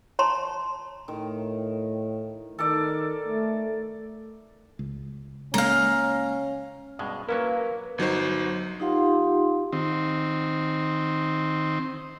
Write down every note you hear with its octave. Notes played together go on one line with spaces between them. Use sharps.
C#5 A5 A#5 C6
A2 D#3
D#3 A4 A#4 D5
A3
C#2
C#2 G#3 A#3 C#4 F5 A#5
G2 B2 G#3
F#3 A#3 C#4 E4 A#4 B4
G1 F#3 D#4 C5
D#4 F4 G4 F5 F#5 C6
D#3 C4